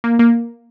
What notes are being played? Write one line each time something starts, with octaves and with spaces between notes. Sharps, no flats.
A#3
A#3